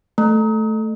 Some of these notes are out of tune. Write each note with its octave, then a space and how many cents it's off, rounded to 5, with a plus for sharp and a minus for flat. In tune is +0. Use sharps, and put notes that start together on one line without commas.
A3 -5